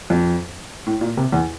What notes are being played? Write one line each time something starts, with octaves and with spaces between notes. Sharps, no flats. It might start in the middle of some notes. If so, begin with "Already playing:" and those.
F2
A2
A#2
C3
E2